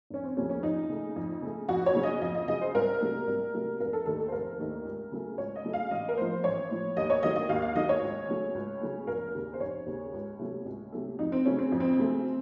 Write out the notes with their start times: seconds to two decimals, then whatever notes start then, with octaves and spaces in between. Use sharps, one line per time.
0.10 F1 C#4
0.23 C4
0.37 D#2 C#3 F3 A3 C#4
0.49 C#4
0.63 F2 D#4
0.89 C#3 A3
1.16 F2
1.42 C#3 A3
1.69 F2 F#4
1.86 C#5
1.95 C#3 F#3
2.03 D#5
2.21 F2 D#5
2.35 D#5
2.48 C#3 F#3 D#5
2.61 C5
2.74 C2 A#4
3.01 C3 F#3 A3
3.27 C2
3.54 C3 F#3 A3
3.80 F1 A#4
3.93 A4
4.06 D#2 D#3 A3 A4
4.19 A4
4.28 C5
4.32 F1 A#4
4.59 D#2 D#3 A3
4.85 C#2
5.12 C#3 F#3 A3
5.38 C#2 C#5
5.56 D#5
5.64 C#3 F#3 A3
5.73 F5
5.91 A1 D#5
6.09 A#4
6.17 A2 F3 C5
6.44 A1 C#5
6.70 A2 F3
6.97 D#2 D#5
7.10 C#5
7.23 D#3 F#3 A3 D#5
7.36 D#5
7.49 D#2 F5
7.62 F5
7.75 D#3 F#3 A3 D#5
7.89 C#5
8.02 C#2
8.29 C#3 F#3 A3
8.55 C#2
8.81 C#3 F#3 A3
9.07 F1 A#4
9.34 D#2 C#3
9.53 C5
9.60 F1 C#5
9.86 D#2 C#3
10.13 C#2
10.39 C3 F#3 A3
10.66 C#2
10.92 C3 F#3 A3
11.19 F2 D#4
11.32 C4
11.45 C#3 F#3 A3 C#4
11.58 C4
11.72 F2
11.80 C4
11.98 C#3 F#3 A3